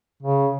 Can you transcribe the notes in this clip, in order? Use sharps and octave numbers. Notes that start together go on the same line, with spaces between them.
C#3